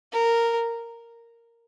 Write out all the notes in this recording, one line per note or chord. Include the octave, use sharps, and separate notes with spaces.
A#4